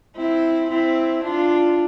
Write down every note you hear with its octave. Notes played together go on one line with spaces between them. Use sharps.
C4 E4
C4 E4
D4 F4